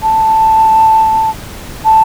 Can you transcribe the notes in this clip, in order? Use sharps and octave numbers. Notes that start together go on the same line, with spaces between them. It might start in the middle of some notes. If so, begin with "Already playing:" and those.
A5
A5